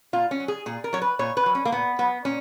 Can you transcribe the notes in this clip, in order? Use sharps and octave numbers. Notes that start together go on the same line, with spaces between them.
A#2 F4
C#4
F#3
G#4
A#2 G#4
A#4
F#3 C#5
B4
A#2 C#5
B4
F#3
C#4
A#3
A#2 B3
F#3 B3
A#2 C#4